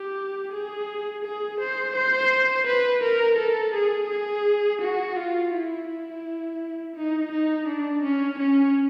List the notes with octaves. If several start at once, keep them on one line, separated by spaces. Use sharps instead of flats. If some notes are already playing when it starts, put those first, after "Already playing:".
Already playing: G4
G#4
G#4
C5
C5
B4
A#4
A4
G#4
G#4
F#4
F4
E4
E4
D#4
D#4
D4
C#4
C#4